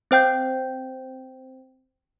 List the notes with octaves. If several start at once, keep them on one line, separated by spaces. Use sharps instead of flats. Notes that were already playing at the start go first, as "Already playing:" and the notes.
C4 C5 G5 G6